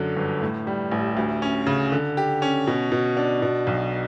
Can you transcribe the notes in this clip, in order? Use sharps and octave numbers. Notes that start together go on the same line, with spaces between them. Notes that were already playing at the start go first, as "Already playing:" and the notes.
Already playing: F#2 D3 C#4
G1
A2
G3
A1
D2
C#4
C#3
D3
G4
C#4
B2
B2
D4
B2
B1